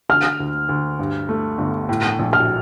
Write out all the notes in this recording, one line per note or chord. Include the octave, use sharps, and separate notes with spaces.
D3 F6
D2
D2
G2
A3
G1
A2
A#1
F6